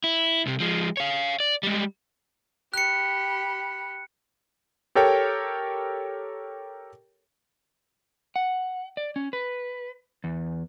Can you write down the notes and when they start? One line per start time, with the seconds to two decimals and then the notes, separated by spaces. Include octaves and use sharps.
0.04 E4
0.46 C2 C3
0.60 F3 G#3
0.97 C#5 F5
1.40 D5
1.63 G3 G#3
2.74 G4 B5 F#6 C#7
4.95 G4 A4 A#4 C#5 G5
8.36 F#5
8.97 D5
9.16 C#4
9.33 B4
10.24 E2